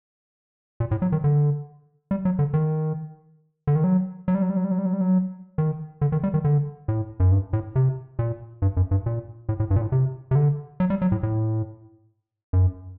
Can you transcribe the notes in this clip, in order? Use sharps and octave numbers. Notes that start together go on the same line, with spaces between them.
A#2
A2
F#3
D#3
D3
G3
F#3
D3
D#3
D3
D#3
F#3
F#3
G3
F#3
G3
F#3
G3
F#3
G3
F#3
G3
F#3
D#3
D3
D#3
G3
D#3
D3
A2
F#2
G2
A2
C3
A#2
G2
F#2
G2
A#2
A2
A2
G2
A#2
A2
C3
C3
D3
F#3
G3
F#3
A2
A2
F#2